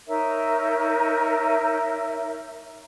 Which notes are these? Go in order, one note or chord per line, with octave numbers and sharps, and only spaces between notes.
D#4 A#4 C#5 E5